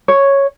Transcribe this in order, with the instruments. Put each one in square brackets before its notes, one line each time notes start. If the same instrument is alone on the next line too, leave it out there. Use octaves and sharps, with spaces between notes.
[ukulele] C#5